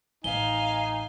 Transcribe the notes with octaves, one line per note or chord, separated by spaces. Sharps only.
A1 D#4 F5 G#5 G7